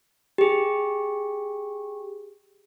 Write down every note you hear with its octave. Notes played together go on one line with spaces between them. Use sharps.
G4 G#4